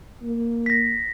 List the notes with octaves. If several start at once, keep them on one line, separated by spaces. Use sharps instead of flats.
A#3
A#6 B6